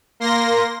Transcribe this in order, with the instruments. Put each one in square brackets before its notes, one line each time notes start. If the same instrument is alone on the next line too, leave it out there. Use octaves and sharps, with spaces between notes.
[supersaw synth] A#3 C6 A#6